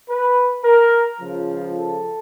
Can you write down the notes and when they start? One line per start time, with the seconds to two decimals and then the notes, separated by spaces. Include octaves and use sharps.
0.10 B4
0.64 A#4
1.20 C#2 C#3 F3
1.76 A4